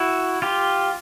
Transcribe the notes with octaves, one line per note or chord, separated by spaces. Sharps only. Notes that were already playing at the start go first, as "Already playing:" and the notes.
Already playing: E4 F#4
F4 G4